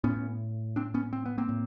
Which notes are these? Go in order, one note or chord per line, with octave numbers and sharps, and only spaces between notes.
A2 B3 C#4
C4 D4
B3 C#4
C4
B3
A#3 C4
A2